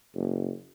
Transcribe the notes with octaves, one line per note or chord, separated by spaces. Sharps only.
F#1